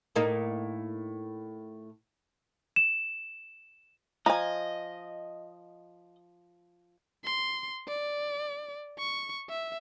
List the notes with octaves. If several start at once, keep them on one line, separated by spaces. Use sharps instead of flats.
A2 A#3 D#4
E7
F3 D#5 G#5 A#5
C6
D5
C#6
E5